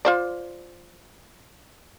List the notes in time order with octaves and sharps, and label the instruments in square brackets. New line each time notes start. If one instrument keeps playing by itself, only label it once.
[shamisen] F4 C5 D5